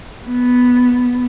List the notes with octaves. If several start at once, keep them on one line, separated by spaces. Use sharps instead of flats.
B3